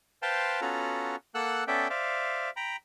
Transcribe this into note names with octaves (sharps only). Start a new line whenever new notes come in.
B4 C5 F5 G5 A5 C6
B3 C#4 F4 F#4 A4 A#5
A#3 A4 F#5 E6 F#6
B3 C#4 A4 D5 E5 G5
C5 D5 E5 F5
G5 A#5 B5